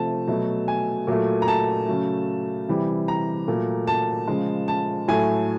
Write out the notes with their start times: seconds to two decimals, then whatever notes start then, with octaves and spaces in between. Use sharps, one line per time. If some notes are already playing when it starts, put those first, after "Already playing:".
Already playing: C3 F3 A3 A5
0.28 B2 F#3 A3
0.68 G#5
1.07 A#2 F#3 A3
1.42 A#5
1.48 A5
1.88 C#3 F#3 A3
2.68 C3 E3 G3
3.08 A#5
3.47 A#2 F#3 A3
3.87 A5
4.27 C#3 F3 G#3
4.68 A5
5.08 A2 F#3 A3 G#5